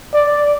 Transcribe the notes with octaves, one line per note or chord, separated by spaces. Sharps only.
D5